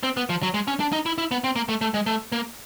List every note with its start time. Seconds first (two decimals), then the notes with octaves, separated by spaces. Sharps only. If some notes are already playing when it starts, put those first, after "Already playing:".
0.03 C4
0.17 B3
0.30 F3
0.43 F#3
0.54 G#3
0.68 C#4
0.80 D4
0.92 D#4
1.06 E4
1.18 E4
1.31 B3
1.44 C4
1.56 A#3
1.69 A3
1.81 A3
1.94 G#3
2.06 A3
2.32 A#3